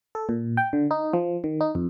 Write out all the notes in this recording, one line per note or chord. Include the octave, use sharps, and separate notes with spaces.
A4
A#2
G5
D3
D#4
F3
D#3
D#4
F2